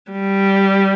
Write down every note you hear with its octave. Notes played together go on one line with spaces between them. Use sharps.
G3